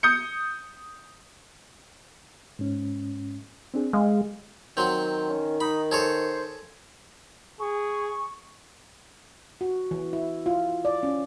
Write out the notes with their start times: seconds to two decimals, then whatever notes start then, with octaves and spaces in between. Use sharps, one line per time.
0.03 D#6 G6 C#7
2.59 G#2 C#4
3.74 C4 D4 G#4
3.93 G#3 F5
4.77 D#3 F#3 C4
5.29 C#4
5.60 D#4 B5
5.91 G#4 A4 C5 C#5
7.60 G#4 C#6
9.61 F#4
9.91 E3
10.13 E4
10.46 F4
10.85 D5
11.03 C#4